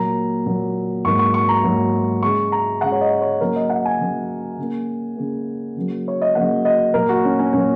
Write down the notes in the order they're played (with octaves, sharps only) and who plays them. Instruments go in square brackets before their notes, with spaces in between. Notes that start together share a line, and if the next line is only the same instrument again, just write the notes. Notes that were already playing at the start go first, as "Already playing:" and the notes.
Already playing: [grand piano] A#2 F#3 A#3 A#5
A#2 F#3 A#3
G#2 F#3 A#3 C#6
C#6
C#6
A#5
G#2 F#3 A#3
C#3 G#3 C#6
A#5
C#3 G#3 F#5
C#5
D#5
C#5
C#3 F#3 A#3 A#4
D#5
F#5
G#5
C#3 F#3 A#3
C#3 A#3
C#3 A#3
C#3 F#3 A#3
C#5
D#5
C#3 F#3 A#3 F#5
D#5
A#2 F#3 A#3 A#4
F#4
C#4
C#4
A#2 F#3 A#3 C#4